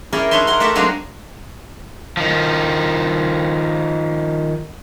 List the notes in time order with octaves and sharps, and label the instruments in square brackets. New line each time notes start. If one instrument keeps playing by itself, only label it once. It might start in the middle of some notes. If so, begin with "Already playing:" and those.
[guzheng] C#4 E4 G#4 A#4 D5 G5
D4 D#4 C#5 E5 C6
A#4 F#5 C6
A3 F#4 G4 E5 F#5 A5
F#3 G#3 A#3 C4 D4 D#4
[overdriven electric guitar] D#3 F3